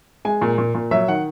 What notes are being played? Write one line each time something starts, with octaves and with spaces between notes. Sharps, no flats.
G#3 G#5
A#2
A#2
A#2
F#3 E5
D#3 F#5